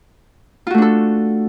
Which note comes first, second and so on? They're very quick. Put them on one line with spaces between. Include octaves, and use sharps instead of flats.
F4 F#4 A3 D4 A4